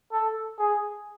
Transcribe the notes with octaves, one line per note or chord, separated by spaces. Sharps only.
A4
G#4